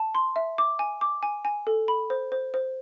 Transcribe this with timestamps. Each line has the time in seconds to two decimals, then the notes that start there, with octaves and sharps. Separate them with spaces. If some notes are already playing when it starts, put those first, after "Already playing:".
Already playing: A5
0.15 C6
0.36 E5
0.58 D6
0.79 G#5
1.01 D6
1.23 G#5
1.45 G#5
1.67 A4
1.88 B5
2.10 C5
2.32 C5
2.54 C5